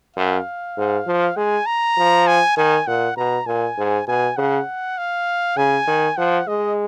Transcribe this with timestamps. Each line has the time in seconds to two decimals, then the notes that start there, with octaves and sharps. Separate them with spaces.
0.16 F#2 F5
0.78 G#2
1.07 F3
1.37 G#3 G#5
1.66 A#5
1.98 F3
2.27 G#5
2.57 D#3 G#5
2.87 A#2 F#5
3.17 B2 A#5
3.47 A#2 G#5
3.78 G#2
4.07 B2 G#5
4.37 C#3 F#5
4.98 F5
5.57 C#3 G#5
5.87 D#3
6.17 F3 F#5
6.48 G#3 D#5